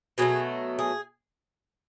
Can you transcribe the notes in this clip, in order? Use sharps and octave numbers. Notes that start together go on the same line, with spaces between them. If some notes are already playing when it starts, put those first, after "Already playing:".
B2 F#3 A3 G#4
G#4